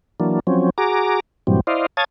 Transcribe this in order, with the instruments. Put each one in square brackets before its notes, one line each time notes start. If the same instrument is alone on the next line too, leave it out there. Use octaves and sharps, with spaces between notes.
[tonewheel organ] E3 F#3 A#3 D4
F3 F#3 C4 C#4
F#4 G#4 A#5 D6
G2 A#2 E3 F#3 G3 C4
E4 C5 D5 D#5 F5
C#5 F5 A5 D#6 G#6 A6